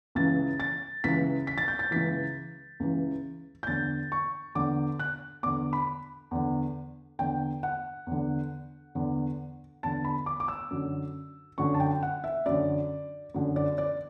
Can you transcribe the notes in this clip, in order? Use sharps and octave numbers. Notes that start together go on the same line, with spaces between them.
C#2 C#3 E3 A6
A6
C#2 C#3 E3 B6
B6
A6
G6
A6
C#2 C#3 E3 B6
C#2 C#3 E3
G6
E2 D3 A6
C#6
E2 D3 D6
F#6
E2 D3 D6
B5
E2 D3
E2 D3 G5
F#5
E2
D3
E2 D3
E2 D3 A5
B5
D6
D6
E6
F#2 D3
F#2 D3 C#6
A5
G5
F#5
E5
F#2 D3 D5
F#2 D3
D5
D5